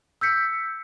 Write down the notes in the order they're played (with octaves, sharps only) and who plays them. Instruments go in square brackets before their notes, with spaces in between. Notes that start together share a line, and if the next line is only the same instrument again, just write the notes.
[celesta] E6 G6 B6 C#7